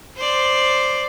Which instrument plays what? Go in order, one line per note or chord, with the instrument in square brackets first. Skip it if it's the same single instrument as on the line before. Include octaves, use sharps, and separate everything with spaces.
[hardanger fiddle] C5 D5